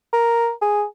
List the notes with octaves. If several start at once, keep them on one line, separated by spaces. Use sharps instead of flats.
A#4
G#4